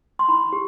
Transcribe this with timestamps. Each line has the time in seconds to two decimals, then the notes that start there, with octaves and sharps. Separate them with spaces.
0.19 C6
0.28 E4 B5
0.53 G4